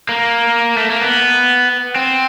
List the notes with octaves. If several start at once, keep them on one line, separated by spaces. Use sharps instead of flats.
A#3
A3
A#3
B3
C4